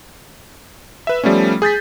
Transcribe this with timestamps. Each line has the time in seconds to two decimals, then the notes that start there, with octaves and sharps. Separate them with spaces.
1.07 B4 E5
1.24 F3 G3 A3 B3 C#4
1.62 G#4 G6 A6 B6